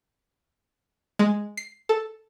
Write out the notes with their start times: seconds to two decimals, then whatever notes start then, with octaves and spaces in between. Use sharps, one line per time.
1.19 G#3
1.57 C7
1.89 A4